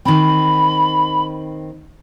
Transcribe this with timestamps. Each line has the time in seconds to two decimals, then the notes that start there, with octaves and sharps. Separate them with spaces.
0.05 D#3 C4 B5